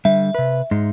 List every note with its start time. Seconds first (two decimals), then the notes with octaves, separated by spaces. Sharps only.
0.05 D3 G3 E5
0.35 C3 B4
0.71 G#2 G#3 D#4